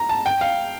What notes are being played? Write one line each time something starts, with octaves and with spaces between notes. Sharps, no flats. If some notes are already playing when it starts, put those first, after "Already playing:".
Already playing: A#5
A5
G5
F5